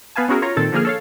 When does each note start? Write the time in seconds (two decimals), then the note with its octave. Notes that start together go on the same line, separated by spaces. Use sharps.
0.16 B3 B4 F5 G#5 A5
0.28 B3 C#4 E4 F#4 G#4 A#4
0.42 F4 C#5 A#5
0.56 A#2 D#3 C4 A4 A6
0.72 D3 F3 A#3 G#4 F6
0.85 A4 C#5 F5